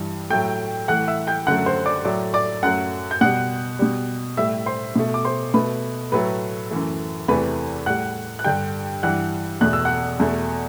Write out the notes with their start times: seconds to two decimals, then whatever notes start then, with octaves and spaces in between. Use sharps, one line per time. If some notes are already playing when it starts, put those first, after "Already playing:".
Already playing: G2 E3 G3
0.30 A2 F#3 A3 G5 G6
0.88 A2 E3 A3 F#5 F#6
1.08 E5 E6
1.27 G5 G6
1.47 F#2 D3 F#3 A3 F#5 F#6
1.66 C5 C6
1.86 D5 D6
2.05 A2 F#3 A3 D5 D6
2.34 D5 D6
2.63 F#2 F#3 A3 F#5 F#6
3.11 G6
3.21 B2 G3 F#5 F#6
3.79 B2 G3
4.37 A2 G3 E5 E6
4.66 C5 C6
4.96 B2 A3
5.14 D6
5.25 C5 C6
5.54 B2 A3 B4 B5
6.12 A2 F#3 A3 B4 B5
6.71 F#2 E3 A3
7.28 E2 C3 E3 A3 B4 B5
7.86 A2 G3 F#5 F#6
8.39 F#6
8.44 G2 D3 G3 G5 G6
9.03 G2 E3 G3 F#5 F#6
9.61 E2 B2 A3 F#6
9.73 E6
9.85 F#5 F#6
10.20 E2 B2 A3